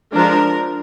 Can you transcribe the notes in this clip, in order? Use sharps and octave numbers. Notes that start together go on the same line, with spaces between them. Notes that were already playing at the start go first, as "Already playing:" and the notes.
F3 G#3 D4 A#4